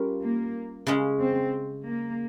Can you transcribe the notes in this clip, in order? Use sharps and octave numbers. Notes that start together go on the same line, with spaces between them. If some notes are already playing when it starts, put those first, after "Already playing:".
Already playing: G3 C#4 F4 A#4
A#3
C#3 G#3 C#4
C4
A#3